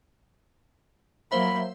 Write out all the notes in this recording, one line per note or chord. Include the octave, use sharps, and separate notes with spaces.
F#3 A#3 C5 E5 B5